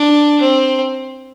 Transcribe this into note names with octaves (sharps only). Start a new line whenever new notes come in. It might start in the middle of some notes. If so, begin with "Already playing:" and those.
Already playing: D4
C4